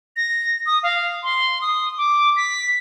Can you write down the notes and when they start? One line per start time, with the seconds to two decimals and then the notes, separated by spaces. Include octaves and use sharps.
0.17 A#6
0.66 D#6
0.83 F5
1.23 C6
1.61 D#6
1.98 D6
2.36 B6